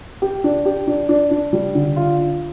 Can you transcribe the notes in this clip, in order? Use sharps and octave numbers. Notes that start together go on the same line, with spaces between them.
G4
D4
G4
D4
D4
D4
G3
D3
F4
F4